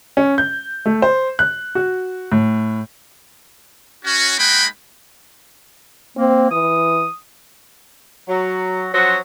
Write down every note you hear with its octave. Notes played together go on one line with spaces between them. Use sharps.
C#4
G6
A3
C5
F#6
F#4
A2
C#4 F#4
G#3 A#3 D#4 F#5 G5 B5
A#3 C4
E3 D#6
F#3
F3 F#3 C#4 F#4 C5